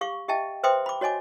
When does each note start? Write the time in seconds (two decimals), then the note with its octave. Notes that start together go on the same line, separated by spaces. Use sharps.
0.01 G4 F5 C#6 D6
0.28 G4 D#5 E5 G5 A5
0.63 B4 C5 E5 G5 C6 D#6
0.86 B5 D6
1.01 F#4 C#5 D#5 G#5 D6